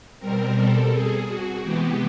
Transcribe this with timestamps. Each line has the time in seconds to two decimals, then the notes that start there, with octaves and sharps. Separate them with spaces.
0.19 B2 G3 C4 A#4
0.55 A4
0.91 G#4
1.26 F#4
1.62 C3 E3 G#3 B3 G4